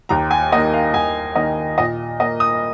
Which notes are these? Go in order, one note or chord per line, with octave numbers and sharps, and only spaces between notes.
D#2 A#5
G#5
D#3 A#3 D#5
F5
D#2 G#5
D#3 A#3 D#5
A#2 D#5
A#3 D#5
D#6